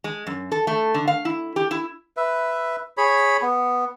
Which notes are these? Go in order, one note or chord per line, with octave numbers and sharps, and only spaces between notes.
G#3
F#2
A4
A3
D3
F5
E4
G4
E4
B4 E5
G#4 C#5 B5
B3